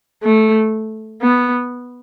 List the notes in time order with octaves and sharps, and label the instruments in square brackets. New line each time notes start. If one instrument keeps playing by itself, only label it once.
[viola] A3
B3